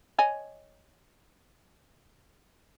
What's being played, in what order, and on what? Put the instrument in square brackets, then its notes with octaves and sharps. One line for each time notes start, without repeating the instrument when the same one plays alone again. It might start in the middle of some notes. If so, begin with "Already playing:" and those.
[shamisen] C#5 D#5 G#5